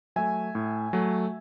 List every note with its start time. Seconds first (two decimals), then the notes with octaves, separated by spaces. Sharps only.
0.16 F#3 A3 E5 G#5
0.55 A2
0.93 F#3 A3